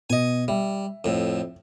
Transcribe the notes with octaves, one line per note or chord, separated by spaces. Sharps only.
B2 D#5 G#5
G3 E5
F2 A2